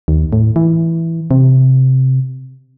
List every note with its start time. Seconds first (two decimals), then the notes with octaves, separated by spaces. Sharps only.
0.08 D#2
0.33 A2
0.56 E3
1.31 C3